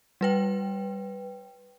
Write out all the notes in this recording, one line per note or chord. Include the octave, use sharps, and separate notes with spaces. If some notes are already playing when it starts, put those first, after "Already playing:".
G3 B4 G5